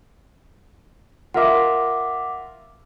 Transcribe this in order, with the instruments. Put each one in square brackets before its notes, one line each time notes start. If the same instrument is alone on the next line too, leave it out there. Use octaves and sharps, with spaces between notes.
[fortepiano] F4 A#4 E5 [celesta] F#5 D6